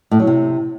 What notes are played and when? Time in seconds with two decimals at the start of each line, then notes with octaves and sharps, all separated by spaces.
0.11 A2
0.19 F#3
0.27 C3